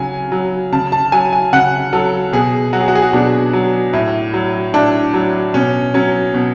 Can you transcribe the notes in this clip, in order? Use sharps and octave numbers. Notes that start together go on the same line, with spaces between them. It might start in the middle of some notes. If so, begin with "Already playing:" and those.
Already playing: C#3 F#3 G#5
F#3
C#3 A5
A5
F#3 G#5
G#5
C#3 F#5
F#3 A4
B2 G#4
F#3 F#4
G#4
F#4
G#4
F#4
B2 D4
F#3
A2
F#3
A2 D4
F#3
B2 C#4
F#3 C#4
B2